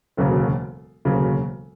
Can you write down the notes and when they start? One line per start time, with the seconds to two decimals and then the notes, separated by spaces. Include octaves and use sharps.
0.17 E1 D2 C#3 F#3 A#3
1.05 E1 D2 C#3 F#3 A#3